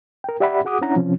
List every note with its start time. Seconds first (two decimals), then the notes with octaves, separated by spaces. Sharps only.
0.24 A#4 G5
0.40 G4 D5 E5 F#5 G5 B5
0.65 F#4 G#4 F#5 D6 D#6
0.82 C#4 D4 E4 C#5 F#5 A#5
0.96 C3 F3 C4 C#4